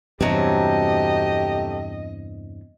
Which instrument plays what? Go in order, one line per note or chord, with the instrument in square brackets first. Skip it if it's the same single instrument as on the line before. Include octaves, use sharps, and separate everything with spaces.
[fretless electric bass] E2 G2 C3 [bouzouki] F#3 A3 C4 [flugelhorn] G4 [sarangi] D#5